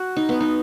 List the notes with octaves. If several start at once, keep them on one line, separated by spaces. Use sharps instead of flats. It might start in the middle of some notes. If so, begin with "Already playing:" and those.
Already playing: F#4
D#4
B3
D#4